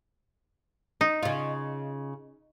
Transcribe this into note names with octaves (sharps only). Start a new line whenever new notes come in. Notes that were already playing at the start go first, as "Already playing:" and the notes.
D#4
C#3 F4